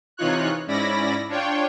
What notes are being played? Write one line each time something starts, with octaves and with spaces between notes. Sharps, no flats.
C3 E3 D#4 F4 C#5 F#6
G#2 C#4 E4 D5 B5 A#6
D4 F4 C#5 G5